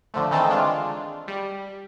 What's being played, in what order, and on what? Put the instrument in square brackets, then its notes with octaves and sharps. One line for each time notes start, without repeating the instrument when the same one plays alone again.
[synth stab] D3 F3 A3
D#3 E3 A3 C4 D#4 A4
G#3 D4 F4
G3